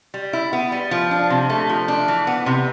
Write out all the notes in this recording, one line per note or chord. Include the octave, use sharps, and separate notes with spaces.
G3
E4
B3
G3
F3
D4
C3
A3
F3
D4
E3
B3
C3